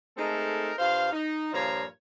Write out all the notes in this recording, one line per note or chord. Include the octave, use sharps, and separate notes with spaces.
G#3 A3 C4 D#4 A4 A#4
G2 F4 C5 F5
D#4
G2 A#2 F3 C#5 F5 A#5